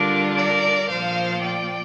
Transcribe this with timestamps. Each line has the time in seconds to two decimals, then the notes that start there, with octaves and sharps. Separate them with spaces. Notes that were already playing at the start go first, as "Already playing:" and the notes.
Already playing: D3 G3 D4 F4 A#4
0.36 A#4 D5
0.89 A#2 F3 A#3 F4 C5 F5
1.42 D5 G5